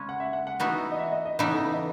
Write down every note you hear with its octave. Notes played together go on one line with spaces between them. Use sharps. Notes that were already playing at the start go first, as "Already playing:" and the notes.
Already playing: C#3 G#3 C#4 C#5
F#5
E5
F#5
F#5
E3 B3 D#4 F#4
D#5
E5
D#5
D#5
C#3 E3 B3 D#4 D#5
A4
B4
D#5